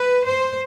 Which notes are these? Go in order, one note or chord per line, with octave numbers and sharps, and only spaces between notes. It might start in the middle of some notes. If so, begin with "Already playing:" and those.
Already playing: B4
C5